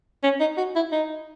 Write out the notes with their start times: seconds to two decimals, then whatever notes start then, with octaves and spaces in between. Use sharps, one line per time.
0.23 C#4
0.40 D#4
0.57 F#4
0.76 E4
0.92 D#4